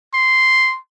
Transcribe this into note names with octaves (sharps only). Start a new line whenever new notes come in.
C6